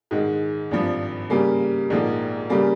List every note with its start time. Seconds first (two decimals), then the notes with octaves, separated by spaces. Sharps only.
0.11 G#2 D#3 G#3
0.71 G#1 G2 F3
1.30 C#3 G3 A#3
1.90 A#1 G#2 F3 A#3
2.49 C#3 G3 A#3